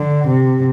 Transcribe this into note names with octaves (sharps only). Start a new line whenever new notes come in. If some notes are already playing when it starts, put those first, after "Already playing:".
Already playing: D3
C3